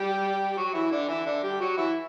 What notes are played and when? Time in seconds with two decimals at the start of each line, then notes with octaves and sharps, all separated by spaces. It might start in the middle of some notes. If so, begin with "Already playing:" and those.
Already playing: G3 G4
0.53 G4
0.58 F#3 F#4
0.74 E3 E4
0.92 D3 D4
1.08 E3 E4
1.26 D3 D4
1.43 G3 G4
1.60 F#3 F#4
1.77 E3 E4